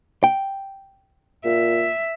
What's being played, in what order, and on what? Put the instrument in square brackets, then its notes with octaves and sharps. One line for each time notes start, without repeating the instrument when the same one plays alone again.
[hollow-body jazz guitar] G5
[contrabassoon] A#2 [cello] E5